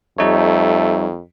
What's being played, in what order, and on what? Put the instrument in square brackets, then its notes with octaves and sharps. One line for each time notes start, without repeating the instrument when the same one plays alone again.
[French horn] F2 [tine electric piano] G3 D#4 C#5 [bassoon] A3